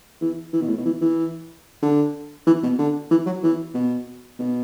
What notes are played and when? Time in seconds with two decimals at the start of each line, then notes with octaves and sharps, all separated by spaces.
0.21 E3
0.53 E3
0.61 B2
0.69 A2
0.77 B2
0.86 E3
1.01 E3
1.82 D3
2.47 E3
2.63 B2
2.78 D3
3.11 E3
3.26 F#3
3.43 E3
3.74 B2
4.39 B2